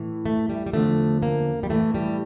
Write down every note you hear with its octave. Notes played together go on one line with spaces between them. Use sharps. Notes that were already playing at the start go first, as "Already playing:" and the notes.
Already playing: A2 E3
A3
G3
G3
E2 D3 F3 A3
A#3
G3
A2 E3 A3
G3